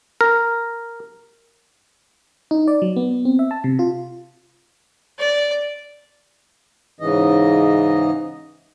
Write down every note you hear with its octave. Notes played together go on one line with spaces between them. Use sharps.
A#4
D#4
D5
F#3
B3
C4
E5
A5
C3
F4
D5
G#2 C#3 E3 D#5